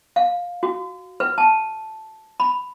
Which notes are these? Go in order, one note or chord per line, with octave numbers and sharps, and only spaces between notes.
F5
F#4
B4
A5
B5